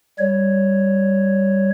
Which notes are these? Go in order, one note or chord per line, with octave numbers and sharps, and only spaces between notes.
G3 C#5